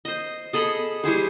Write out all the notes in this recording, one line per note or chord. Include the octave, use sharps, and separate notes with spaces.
C5 D#5
G#4 A4 D#5 B5
G3 E4 G#4 C5